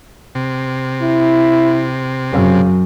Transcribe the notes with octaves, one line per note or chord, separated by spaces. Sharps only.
C3
E4
F#2 C#3